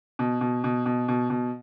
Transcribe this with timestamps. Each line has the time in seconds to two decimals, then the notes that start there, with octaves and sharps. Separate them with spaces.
0.19 B2
0.41 B2
0.64 B2
0.86 B2
1.08 B2
1.30 B2